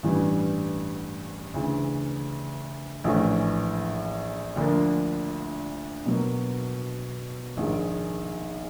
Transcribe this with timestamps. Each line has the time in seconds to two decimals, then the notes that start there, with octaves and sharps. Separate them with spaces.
0.03 A1 G2 E3 G3
1.54 D2 C#3 E3
3.04 A#1 A2 E3 A3 C#4
4.56 D2 D3 F3 A#3 D4
6.06 B2 F#3 A#3
7.57 A#1 G#2 D#3 G#3